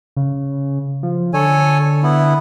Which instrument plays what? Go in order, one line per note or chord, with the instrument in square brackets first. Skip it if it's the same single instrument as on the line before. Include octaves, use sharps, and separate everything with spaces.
[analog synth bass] C#3
F3
[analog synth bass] D3 [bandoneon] A4 C#5 G#5
[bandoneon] B3 E4